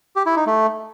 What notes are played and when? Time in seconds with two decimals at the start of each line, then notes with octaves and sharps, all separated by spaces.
0.16 G4
0.26 E4
0.36 D#4
0.47 A3